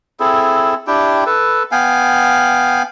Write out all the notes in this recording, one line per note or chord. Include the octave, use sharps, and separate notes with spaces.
C4 E4 G#4 A4
D4 E4 G4 G5
A4 B4
B3 F5 G5 G#5